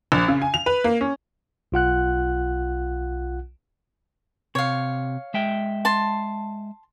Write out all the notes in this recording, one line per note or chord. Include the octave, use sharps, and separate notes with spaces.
A#1
C#3
G#5
F7
B4
A#3
C#4
B1 F4 F#5 F#6
C3 C#5 F5
G#3 E5 G5
A5 C6